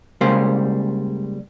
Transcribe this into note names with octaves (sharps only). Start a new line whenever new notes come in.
C#3 G3 G#3 A#3 C5